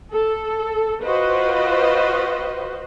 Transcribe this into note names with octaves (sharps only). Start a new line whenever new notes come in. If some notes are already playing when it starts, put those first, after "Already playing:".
A4
F4 F#4 B4 C5 D#5